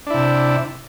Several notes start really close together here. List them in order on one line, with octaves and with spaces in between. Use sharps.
D4 E4 C3